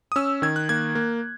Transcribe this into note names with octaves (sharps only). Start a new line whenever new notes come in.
D#6
C#4 E6
D#3 G#6
F#6
A#3 G#6
A#3